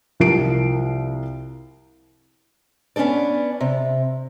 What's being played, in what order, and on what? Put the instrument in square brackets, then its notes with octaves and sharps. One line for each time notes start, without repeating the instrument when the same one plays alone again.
[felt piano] C2 F3 A#4 C7 D7
[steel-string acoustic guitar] B3 C#4 D4 A4 D5
C3